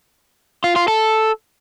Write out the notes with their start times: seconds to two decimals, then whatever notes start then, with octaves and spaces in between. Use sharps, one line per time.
0.64 F4
0.76 F4
0.88 A4